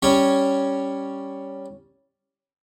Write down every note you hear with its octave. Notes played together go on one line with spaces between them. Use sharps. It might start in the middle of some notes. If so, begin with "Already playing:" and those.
G3 C#4 C#5